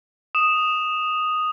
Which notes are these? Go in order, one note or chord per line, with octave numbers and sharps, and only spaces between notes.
D#6 E7